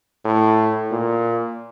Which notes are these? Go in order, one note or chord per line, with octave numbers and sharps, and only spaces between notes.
A2
A#2